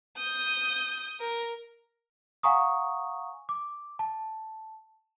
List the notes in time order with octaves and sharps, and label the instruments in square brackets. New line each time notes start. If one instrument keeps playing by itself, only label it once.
[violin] D#6 G6
A#4
[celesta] F5 F#5 G#5 A#5 C#6 D#6
D6
A5